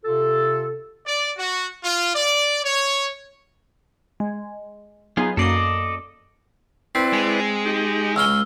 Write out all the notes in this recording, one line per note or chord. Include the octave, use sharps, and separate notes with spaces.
C3 F4 A4
D5
F#4
F4
D5
C#5
G#3
F#3 B3 D#4 F4 G#4
F#2 A#3 A4 D5 D#5 C7
C4 E4 B4 D5 C7
G#3
D#4 G4
C#2 C#4 B5 E6 F6 G7